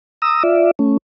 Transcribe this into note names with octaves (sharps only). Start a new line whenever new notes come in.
A#5 D#6 E6
F4 D5 E5
A3 C#4